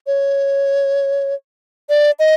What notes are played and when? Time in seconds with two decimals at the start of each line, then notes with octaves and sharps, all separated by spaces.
0.07 C#5
1.90 D5
2.19 D#5